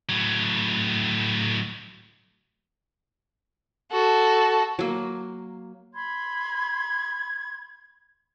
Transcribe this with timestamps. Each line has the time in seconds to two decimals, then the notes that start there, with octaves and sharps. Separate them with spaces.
0.09 A2 F#3
3.92 F#4 A4
4.79 F#3 A#3
5.95 B5 C6 G#6